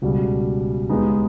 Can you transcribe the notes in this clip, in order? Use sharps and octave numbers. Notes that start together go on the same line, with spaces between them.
C#2 B2 G3
D#2 D#3 G#3 B3 D#4